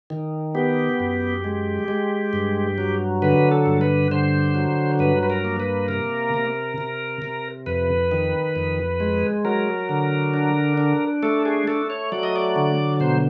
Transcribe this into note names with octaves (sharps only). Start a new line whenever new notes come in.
D#3
B3 G4
F#2
G#3
G#3
G2
F#3
D3 B4
A4
G2
B4
D3 C5
F#3
G2 B4
B4
A#4
A#3
B4
C3 A#4
C3
C3
C3
F2 B4
D#3
F2
G#3
F#3 A#4
D3
D4
D4
A3 A4
G#4
A3 A4
C#5
F#3 D5
D#5
D5
D3
B2 C5